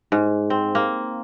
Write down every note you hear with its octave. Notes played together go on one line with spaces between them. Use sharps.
G#2
C4
A#3